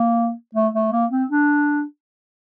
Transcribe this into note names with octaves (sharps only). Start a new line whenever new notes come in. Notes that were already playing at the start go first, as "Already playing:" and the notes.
Already playing: A#3
A3
A3
A#3
C4
D4